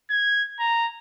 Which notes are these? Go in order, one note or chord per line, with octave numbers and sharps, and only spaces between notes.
G#6
A#5